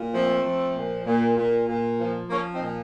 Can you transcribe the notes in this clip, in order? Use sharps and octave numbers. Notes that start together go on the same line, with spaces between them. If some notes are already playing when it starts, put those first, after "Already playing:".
Already playing: A#2
F3 A3 C4
F3
A#2
A#2
A#2
A#2
F3
F3 A#3 C#4
C4 D#4
A#2